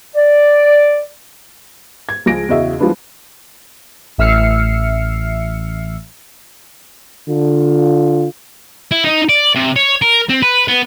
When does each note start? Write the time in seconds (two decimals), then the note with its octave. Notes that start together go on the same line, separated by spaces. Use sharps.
0.15 D5
2.09 G#6
2.26 C#2 F3 G#4 A#6 D7
2.49 E2 C#3 F#4 D#5 E5
2.79 F3 G3 G#3 B3 D4 E4
4.18 A1 E5 E6 F6 C7 C#7
7.28 D3 F4
8.91 E4
9.04 D#4
9.29 D5
9.55 C3
9.76 C#5
10.02 A#4
10.29 C4
10.42 B4
10.68 B3